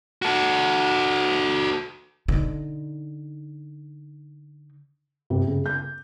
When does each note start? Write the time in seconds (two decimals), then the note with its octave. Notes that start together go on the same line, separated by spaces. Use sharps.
0.22 F#4 A4
2.28 D3 D#4
5.30 C3
5.47 C#3
5.66 G6